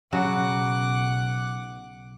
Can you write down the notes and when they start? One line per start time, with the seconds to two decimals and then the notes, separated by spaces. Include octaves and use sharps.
0.12 B1 C#3 F#3 F#4 F#5 D6